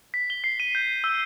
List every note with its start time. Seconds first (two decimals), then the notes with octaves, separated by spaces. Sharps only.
0.14 B6
0.30 G7
0.44 C7
0.60 D#7
0.75 G6
1.04 E6